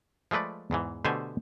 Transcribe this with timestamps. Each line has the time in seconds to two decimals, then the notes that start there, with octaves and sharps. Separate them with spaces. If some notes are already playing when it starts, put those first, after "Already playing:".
0.31 F3 G#3 A3 B4 D5
0.71 E2 G#2 E3
1.05 B2 D3 A3 G4 C5 G#5